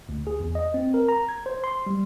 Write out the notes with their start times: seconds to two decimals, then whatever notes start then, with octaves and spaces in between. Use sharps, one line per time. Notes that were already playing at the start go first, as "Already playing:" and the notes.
0.09 D2
0.27 G#4
0.40 E2
0.55 D#5
0.74 C4
0.94 A#4
1.09 A#5
1.29 G#6
1.46 C5
1.64 C6
1.86 G3